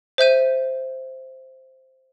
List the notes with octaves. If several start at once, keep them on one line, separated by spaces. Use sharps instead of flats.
C5 E5 G6 D#7